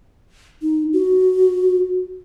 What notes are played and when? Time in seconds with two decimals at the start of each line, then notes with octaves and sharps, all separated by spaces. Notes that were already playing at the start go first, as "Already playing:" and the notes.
0.62 D#4
0.93 F#4